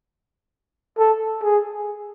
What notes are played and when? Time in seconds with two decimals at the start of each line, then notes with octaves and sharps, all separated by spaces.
0.98 A4
1.43 G#4